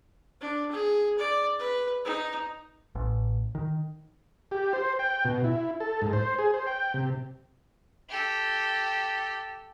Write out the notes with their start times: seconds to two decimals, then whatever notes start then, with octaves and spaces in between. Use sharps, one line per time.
0.41 D4
0.71 G#4
1.18 D5
1.59 B4
2.05 D#4
2.95 A1
3.55 D#3
4.51 G4
4.73 C5
4.99 G5
5.25 B2
5.44 E4
5.80 A4
6.02 G#2
6.13 C5
6.38 G#4
6.54 C5
6.67 G5
6.94 C3
8.09 G4 A4